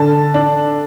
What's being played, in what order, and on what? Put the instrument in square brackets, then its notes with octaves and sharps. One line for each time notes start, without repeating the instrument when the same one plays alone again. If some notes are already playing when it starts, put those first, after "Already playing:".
Already playing: [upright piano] D3 A5
D4